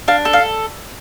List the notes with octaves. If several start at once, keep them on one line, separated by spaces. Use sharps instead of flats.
D4 F5
A4
F5